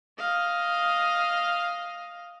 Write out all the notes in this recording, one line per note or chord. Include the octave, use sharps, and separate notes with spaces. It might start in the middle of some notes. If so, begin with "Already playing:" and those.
D#5 F5